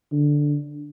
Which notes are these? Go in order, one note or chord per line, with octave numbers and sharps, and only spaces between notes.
D3